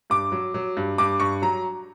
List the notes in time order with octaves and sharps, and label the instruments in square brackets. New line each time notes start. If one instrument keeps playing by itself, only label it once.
[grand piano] G2 D6
F#3
F#3
G2
G2 D6
G2 C#6
F#3 A#5